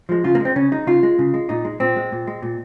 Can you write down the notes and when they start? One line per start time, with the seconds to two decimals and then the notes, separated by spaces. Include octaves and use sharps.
0.09 F3 G#3
0.24 C#3 F4
0.35 A#3
0.40 G#3 C4
0.56 C#3 C#4
0.72 G#3 D#4
0.87 C#3 F4
1.03 G#3
1.19 C#3
1.34 G#3
1.49 A#2 D#4
1.65 G#3
1.80 A#2 C4
1.96 G#3
2.12 A#2
2.27 G#3
2.42 A#2